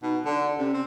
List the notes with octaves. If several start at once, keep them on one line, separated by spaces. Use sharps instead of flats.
B2 D#4
D3 D5
C3 C#4
C4